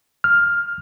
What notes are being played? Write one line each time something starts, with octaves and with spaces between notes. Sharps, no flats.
F6